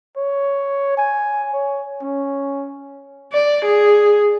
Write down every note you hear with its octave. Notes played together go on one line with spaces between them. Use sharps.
C#5
G#5
C#5
C#4
D5
G#4